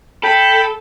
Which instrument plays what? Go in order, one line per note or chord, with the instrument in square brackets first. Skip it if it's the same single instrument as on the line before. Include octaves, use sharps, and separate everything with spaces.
[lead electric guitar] A4 [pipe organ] G5 [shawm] B5